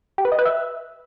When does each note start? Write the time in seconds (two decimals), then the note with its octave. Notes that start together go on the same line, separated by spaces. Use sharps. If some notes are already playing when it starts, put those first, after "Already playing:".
0.18 G4
0.25 B4
0.32 D#5
0.39 B4
0.45 E5